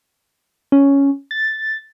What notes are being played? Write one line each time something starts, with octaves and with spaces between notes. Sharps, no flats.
C#4
A6